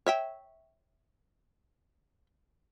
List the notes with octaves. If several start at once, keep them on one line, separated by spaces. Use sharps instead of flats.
C#5 E5 G5